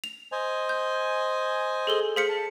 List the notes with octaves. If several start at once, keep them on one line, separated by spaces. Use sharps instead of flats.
F7
C5 D#5 G#5
G6
G#4 A4 G7
G#4 C5 F5 B6 C#7
A5